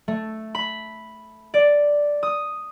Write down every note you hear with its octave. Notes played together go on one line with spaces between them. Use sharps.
A3
B5
D5
D#6